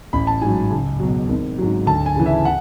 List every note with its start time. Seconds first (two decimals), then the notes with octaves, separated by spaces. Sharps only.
0.13 A1 B5
0.27 A5
0.42 G#2 F#3 G#5
0.71 C#2
1.00 B2 F#3
1.29 G#1
1.58 G#2 F#3
1.87 D2 A5
2.06 G#5
2.16 C#3 E3
2.26 E5
2.45 F#5